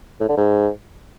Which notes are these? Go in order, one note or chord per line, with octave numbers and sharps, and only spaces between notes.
A2
D3
G#2